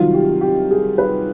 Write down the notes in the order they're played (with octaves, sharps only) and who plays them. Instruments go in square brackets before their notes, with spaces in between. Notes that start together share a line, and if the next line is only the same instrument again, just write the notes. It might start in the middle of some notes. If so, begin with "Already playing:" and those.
Already playing: [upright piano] C2 C3 D#3 F#3 F4
G4
G4
G#4
B4